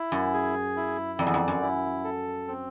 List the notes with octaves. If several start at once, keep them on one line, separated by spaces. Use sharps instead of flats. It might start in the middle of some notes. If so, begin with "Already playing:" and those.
Already playing: E4
F#2
G#4
E4
F2 D5
E2
F2
F#2
E4
A4
C4